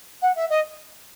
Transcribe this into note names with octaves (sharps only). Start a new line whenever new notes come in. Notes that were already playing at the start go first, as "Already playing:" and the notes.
F#5
E5
D#5